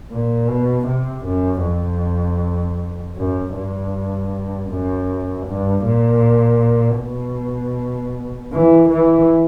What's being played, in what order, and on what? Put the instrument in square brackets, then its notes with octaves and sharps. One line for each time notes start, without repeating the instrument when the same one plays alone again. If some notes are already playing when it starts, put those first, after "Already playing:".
[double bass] A#2
B2
C3
F#2
F2
F#2
G2
F#2
G2
A#2
B2
E3
E3